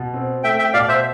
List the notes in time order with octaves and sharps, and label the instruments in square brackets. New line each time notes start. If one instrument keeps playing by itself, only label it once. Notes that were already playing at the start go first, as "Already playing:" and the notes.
Already playing: [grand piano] B2
C4
[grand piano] A3 [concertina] E5 G5
[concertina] E5 G5
[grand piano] B2 [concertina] D5 F5
[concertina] C5 E5